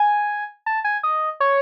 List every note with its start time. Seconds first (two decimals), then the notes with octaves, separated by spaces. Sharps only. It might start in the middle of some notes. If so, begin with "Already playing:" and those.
Already playing: G#5
0.66 A5
0.84 G#5
1.03 D#5
1.40 C#5